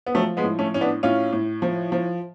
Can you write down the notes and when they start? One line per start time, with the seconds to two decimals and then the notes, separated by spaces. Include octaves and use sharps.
0.06 B3
0.15 F3 F#3 A3
0.37 G#3 B3
0.44 A2
0.59 A3 C#4
0.74 A2 C#4
0.81 B3 D4
1.03 A2 C#4 F4
1.32 A2
1.62 F3
1.92 F3